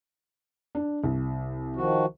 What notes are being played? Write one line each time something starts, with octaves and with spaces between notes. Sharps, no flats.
D4
C2
D#3 F3 F#4